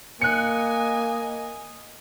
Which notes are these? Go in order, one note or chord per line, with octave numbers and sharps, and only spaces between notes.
A#3 D#5 G#5 F#6 C#7